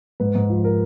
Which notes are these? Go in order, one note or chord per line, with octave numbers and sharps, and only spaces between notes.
G#2 B4
G#2
F3
A#4